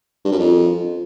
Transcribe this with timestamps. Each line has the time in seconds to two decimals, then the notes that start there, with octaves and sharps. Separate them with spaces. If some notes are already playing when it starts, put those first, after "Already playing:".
0.25 G2
0.32 F#2
0.40 F2